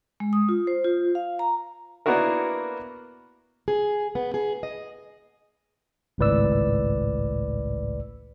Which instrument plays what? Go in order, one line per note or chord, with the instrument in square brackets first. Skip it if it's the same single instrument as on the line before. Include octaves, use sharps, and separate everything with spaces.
[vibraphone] G#3
D#6
F4
C5
F4
F5
A#5
[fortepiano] A#3 B3 D4 E4 F#4 A#4
[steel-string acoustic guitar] G#4
B3
G#4
D#5
[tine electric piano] G#1 C#2 A2 B4 D5 E6